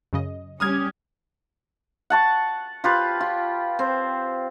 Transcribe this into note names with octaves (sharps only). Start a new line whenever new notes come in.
F#2 C#3 D#5
G3 C#4 G4 D#6 F6 G#6
F#5 A5 C#6
F4 G4 B4
F4
C4